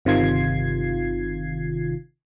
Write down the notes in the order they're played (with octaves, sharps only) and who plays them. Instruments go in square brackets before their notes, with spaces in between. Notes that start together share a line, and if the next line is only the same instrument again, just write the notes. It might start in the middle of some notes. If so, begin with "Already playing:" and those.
[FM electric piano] G1 C3 D#3 F4 G#6 C7